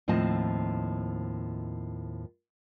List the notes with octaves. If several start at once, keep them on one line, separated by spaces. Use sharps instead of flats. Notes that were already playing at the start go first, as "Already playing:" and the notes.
D#2 A2 F3 C4 D#5 A5